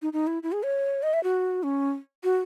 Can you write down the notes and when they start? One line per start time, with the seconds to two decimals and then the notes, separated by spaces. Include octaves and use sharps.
0.02 D#4
0.13 D#4
0.27 E4
0.43 E4
0.52 G#4
0.63 C#5
1.03 D#5
1.13 E5
1.24 F#4
1.63 C#4
2.24 F#4